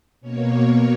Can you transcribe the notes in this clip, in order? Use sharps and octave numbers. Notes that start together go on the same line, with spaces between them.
B2 A#3 C#4 C#5